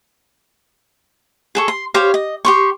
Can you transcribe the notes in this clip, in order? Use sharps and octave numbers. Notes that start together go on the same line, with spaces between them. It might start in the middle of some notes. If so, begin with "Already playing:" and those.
G#4 A4 C#6
C6
G4 C5 C#5 F5
D#5
G4 C6 C#6